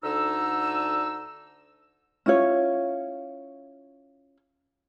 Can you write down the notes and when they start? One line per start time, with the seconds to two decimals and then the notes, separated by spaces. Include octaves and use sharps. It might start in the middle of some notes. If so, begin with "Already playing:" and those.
0.03 D2 D3 D#4 E6
2.26 C#4 E4 F4 C#5